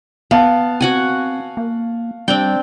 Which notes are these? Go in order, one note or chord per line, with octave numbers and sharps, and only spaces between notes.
B3 F5 A5
C4 F#4 F#5 G#5
A#3
G3 C4 D4 G5